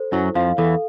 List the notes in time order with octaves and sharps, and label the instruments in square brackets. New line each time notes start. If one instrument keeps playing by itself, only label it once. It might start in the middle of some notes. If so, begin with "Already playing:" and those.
Already playing: [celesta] A4 C5
[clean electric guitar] F#2 F#3 [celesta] E4
[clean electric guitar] F2 F3 [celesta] F5
[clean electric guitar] E2 E3 [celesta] A4